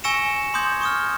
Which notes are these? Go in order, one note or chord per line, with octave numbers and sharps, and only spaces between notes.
G#5 C#6 E6 A#6 C#7 E7
C6 D6 D#6 G6 G#6
C#6 D#6 F6